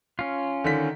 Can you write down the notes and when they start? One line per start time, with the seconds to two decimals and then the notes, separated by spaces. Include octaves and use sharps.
0.19 C#4 F4
0.64 D3 D#3 B6